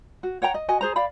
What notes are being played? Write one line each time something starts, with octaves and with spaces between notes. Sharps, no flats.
F#4
C#5 F#5 G5 A#5
D#5
F#4 D#5 G#5
G#4 C5 A#5
D5 F5 B5